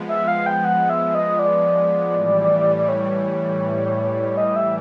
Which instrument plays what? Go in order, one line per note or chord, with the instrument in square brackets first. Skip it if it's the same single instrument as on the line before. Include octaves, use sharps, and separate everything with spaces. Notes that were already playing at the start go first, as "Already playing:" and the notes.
Already playing: [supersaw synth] F3 G#3 B3
[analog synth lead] E5
F5
G5
F#5
E5
D#5
D5
[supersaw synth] A2 E3 G3
[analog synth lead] C#5
D#5
E5